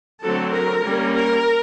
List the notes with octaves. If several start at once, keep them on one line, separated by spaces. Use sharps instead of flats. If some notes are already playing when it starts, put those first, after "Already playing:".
D3 F#3 A3 C4 A4
A#4
G3 A#3 C#4
A#4